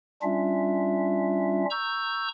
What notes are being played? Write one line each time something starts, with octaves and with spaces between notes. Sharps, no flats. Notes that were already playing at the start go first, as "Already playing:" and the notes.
G3 C#4 D4 F4 E5
A#5 C#6 E6 G6